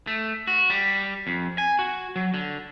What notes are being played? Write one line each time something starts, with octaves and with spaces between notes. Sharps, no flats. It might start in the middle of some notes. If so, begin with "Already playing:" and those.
A3
F#4
G3
F2
G#5
F#4
F#3
D3